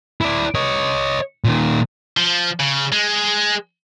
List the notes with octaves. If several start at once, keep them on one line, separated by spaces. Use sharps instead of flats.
E4 D5
C#5 D#5
A#2 D#3
F3
C#3
G#3